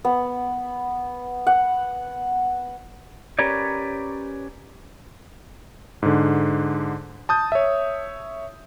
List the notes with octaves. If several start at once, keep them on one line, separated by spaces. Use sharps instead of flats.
B3
F#5
C#4 G4 A#4 B4 C#5 D5
G#2 D3
A5 D#6 G6
C#5 E5